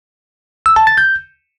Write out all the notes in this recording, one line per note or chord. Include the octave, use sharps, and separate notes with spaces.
E6
A5
A6
G6